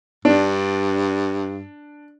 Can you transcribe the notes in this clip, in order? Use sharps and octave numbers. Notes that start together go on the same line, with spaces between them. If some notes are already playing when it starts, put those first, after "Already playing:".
G2 D4